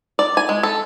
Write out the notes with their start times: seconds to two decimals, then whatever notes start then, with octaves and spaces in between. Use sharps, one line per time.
0.19 D5
0.37 G#5
0.49 G#3
0.63 A4